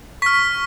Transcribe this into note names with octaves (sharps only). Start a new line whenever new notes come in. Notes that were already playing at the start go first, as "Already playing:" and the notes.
C#6 F6 B6